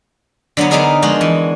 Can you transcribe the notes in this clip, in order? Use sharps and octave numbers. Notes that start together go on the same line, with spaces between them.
D3 F#3 A#3 B3
D3 B3 D4 D#4 G#4 A#4
F3 G#3 F4 F#4
E3